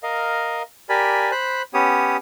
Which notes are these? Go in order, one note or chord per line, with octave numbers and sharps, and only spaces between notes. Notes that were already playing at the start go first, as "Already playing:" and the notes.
A#4 D#5 F5
G4 A#4 D5 G#5 B5
C5 B5 F#6
B3 C#4 G4 C#5 D#6